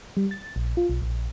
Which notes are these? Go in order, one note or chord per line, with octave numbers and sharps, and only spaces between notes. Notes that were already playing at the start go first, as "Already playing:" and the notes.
G3
A6
A#1
F4
B1
A#1